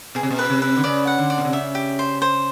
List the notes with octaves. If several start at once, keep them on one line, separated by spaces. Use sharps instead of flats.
B2 G#4
C3
B2
B4
C3
B4
D3
C#3 D5
F#5
D3
D5
B2
C3
C#3 E5
G4
C5
C5